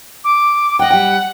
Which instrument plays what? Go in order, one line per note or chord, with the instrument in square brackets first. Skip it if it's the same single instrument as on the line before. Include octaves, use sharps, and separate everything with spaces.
[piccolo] D6
[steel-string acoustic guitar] D#5 G5 [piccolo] F#5
[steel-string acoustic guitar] G3 G5